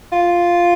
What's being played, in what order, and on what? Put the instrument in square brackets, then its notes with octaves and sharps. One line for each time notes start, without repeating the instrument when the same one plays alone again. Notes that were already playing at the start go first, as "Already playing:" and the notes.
[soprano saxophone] F4